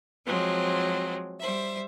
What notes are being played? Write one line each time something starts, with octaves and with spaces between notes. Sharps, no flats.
F3 F#3 G#3 C4
G3 C5 E5